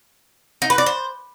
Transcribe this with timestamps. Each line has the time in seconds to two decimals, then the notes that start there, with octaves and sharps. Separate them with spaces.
0.62 D#4
0.70 B4
0.78 D5
0.86 C5